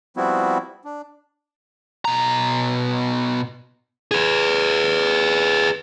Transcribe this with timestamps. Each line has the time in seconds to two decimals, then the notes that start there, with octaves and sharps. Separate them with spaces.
0.17 F3 G3 B3 C4 E4 F#4
0.84 D4
2.05 B2 A#5
4.11 G#4 B4